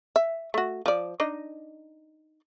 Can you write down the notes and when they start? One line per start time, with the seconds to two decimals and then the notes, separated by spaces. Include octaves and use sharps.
0.16 E5
0.54 A3 F#4
0.86 F3 D5
1.20 D4 D#4 D#5